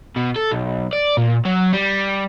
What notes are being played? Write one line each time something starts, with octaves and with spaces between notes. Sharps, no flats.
B2
A4
B1
D5
A#2
F#3
G3